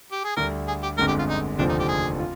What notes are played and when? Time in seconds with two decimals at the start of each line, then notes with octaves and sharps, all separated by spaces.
0.12 G4
0.24 G#4
0.37 D2 D3 G3 A#4
0.68 G#4
0.83 G4
0.98 G1 F2 D3 G#3 A#4
1.08 G4
1.19 F4
1.29 D#4
1.58 F1 D#2 D3 F3 C4 D4
1.69 D#4
1.79 G4
1.88 G#4
2.19 F4